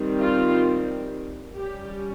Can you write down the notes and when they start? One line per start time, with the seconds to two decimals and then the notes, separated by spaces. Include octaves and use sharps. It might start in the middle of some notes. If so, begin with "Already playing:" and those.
Already playing: D#3 G3 C4
0.20 F4
1.56 G3 C#4 G4